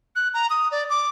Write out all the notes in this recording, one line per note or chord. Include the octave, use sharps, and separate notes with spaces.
F#6
A#5
D#6
D5
D6